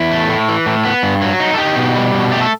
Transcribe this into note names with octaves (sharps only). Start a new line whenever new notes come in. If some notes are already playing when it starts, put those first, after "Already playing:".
Already playing: E2 E4
A3
A2
E3
A2
B3
G2
F#3
D#4
A4
D#4 G4
B2
G3
B2
A3 G4
A4